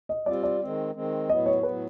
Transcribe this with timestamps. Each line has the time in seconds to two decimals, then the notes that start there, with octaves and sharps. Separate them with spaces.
0.09 D#5
0.26 G3 C4 F4 D5
0.43 D5
0.61 D#3 G#3 C4
0.95 D#3 G#3 C4
1.29 A2 F#3 B3 D#5
1.46 C#5
1.63 A2 F#3 B3 B4